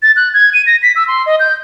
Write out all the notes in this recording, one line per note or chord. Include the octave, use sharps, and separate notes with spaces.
A6
F#6
G#6
D#7
A#6
B6
E6
C6
D#5
G6